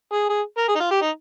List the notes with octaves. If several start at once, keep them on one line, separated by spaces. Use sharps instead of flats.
G#4
G#4
A#4
G#4
D#4
F4
G4
D#4